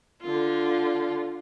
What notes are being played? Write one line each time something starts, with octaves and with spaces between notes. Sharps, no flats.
D3 F4